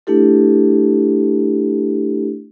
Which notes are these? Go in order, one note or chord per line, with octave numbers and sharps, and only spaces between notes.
A3 D4 E4 G4 A4